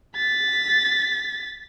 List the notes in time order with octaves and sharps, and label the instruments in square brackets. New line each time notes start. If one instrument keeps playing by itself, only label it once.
[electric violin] A6 B6